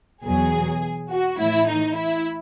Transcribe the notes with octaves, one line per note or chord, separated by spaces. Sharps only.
E2 B2 F#3 G#4
F#4
A2 E3 E4
D#4
E4